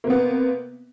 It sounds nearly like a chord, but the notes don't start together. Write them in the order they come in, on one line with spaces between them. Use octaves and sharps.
A#3 C3 B3